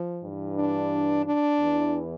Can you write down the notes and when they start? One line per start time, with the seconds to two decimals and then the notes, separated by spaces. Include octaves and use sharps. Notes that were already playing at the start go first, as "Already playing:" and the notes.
Already playing: F3
0.23 G2 E3
0.58 D4
1.26 D4
1.60 E2 E3